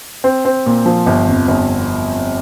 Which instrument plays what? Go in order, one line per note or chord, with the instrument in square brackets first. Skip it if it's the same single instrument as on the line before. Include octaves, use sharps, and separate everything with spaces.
[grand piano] C4
C4
A#2
F3
G1
F2
G1